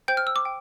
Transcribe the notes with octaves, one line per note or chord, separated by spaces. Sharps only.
C5 G5 G6
F6
E6
D6
G5